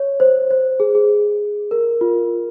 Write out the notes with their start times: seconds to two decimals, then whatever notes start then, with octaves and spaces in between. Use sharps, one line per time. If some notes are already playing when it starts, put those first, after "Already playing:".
Already playing: C#5
0.20 C5
0.51 C5
0.80 G#4
0.95 G#4
1.71 A#4
2.01 F4